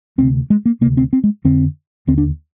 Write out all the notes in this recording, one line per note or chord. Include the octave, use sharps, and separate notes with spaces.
D2 C3 C4
G#3
A#3
D2 C3 A#3
C4
C4
G#3
F2 D3 C4
D#2 D3 C4
D4